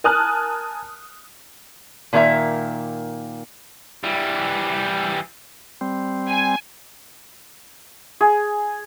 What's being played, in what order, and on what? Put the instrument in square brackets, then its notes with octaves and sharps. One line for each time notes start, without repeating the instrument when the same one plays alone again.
[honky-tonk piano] A#4 G#5 A5 D#6 F6 F#6
[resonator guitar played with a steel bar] A#2 D#3 A#3 D#4 E5 A#5
[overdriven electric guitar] E3 G3
[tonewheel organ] G3 C4
[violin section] G#5
[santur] G#4